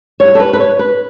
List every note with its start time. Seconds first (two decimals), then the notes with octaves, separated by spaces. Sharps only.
0.20 A2 G3 C#5
0.35 A4
0.40 B4
0.53 B4
0.60 C#5
0.79 B4